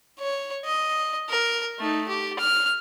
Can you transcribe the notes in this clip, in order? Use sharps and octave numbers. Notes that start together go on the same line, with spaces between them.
C#5
D#5
A#4
A3 D#4
G4
F6